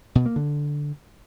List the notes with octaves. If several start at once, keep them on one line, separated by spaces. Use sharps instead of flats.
B2
A#3
D3